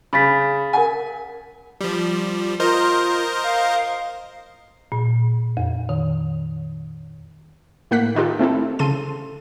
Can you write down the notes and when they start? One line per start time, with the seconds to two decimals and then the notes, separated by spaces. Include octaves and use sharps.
0.13 C#3 B5 A6 B6
0.73 A#4 F#5 G#5
1.81 F3 G3
2.60 F4 A#4 C5 D#5
3.43 F5
4.92 A#2
5.57 F2
5.89 D#3
7.91 A2 A#3 F#5 F#6 B6
8.15 D#3 D#4 F4 G4 A4
8.39 A3 C4 E4 A4
8.79 C#3 A4 C6 D#7